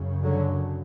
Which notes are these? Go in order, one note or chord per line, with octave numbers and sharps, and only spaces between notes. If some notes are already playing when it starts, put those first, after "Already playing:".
Already playing: F#2 C#3
D3 F#3